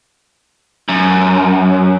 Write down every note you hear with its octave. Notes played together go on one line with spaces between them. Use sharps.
F#2